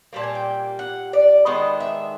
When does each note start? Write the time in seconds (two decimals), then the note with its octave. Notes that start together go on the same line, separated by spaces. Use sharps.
0.13 A#2 G3 A#3 A5
0.23 G#5
0.35 G5
0.79 F#5
1.13 D5
1.46 D#3 G#3 B3 D4 D#5
1.80 E5